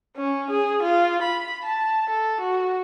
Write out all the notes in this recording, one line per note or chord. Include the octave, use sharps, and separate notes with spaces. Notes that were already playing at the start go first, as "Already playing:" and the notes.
C#4
G#4
F4
B5
A5
A4
F#4